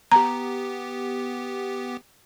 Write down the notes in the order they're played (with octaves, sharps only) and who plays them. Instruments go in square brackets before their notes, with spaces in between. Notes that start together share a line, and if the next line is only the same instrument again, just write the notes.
[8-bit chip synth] B3 G4 [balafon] A#5